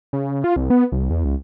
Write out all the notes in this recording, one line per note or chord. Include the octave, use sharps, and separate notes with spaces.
C#3
F4
C2
B3
C2
E2
C#2